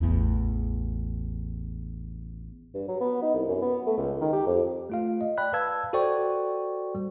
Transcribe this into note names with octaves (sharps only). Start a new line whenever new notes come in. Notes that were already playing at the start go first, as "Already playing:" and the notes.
A1 E2
G2
F#3
B3
D#4
C2
F#2
B3
A3
C#2
D#3
G4
F2
A3 F4 F5
D#5
D5 G5 B5 F#6
B4 F5 A5 E6 G#6
F#4 A4 C5 D5 G5 C#6
G3